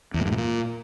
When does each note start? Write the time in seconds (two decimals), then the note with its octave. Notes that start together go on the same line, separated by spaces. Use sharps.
0.14 E2
0.20 A2
0.26 G2
0.32 A2
0.38 A#2